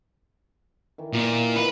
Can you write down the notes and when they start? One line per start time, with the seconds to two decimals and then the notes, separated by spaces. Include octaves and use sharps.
0.98 D#3 E3
1.13 A#2
1.56 B4